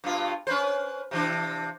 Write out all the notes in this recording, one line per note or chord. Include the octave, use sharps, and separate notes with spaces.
G2 B2 F4
C#4 B4 C5
C3 E3 D4